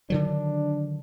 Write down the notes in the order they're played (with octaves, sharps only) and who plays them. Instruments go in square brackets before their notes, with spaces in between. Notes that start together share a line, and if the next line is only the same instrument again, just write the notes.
[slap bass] D3 D#3 F#3 [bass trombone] D4